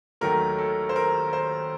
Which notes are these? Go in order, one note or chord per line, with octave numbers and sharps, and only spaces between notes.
D#2 D#3 F#3 A3 A#4
A4
C5
A#4
C5